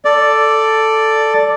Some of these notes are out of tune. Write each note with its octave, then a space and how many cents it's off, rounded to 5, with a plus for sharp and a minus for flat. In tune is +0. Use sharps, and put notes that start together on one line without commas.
A4 +5 D5 +0